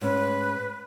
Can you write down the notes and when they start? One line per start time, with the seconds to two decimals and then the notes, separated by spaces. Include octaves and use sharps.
0.01 G#2 C#4 B4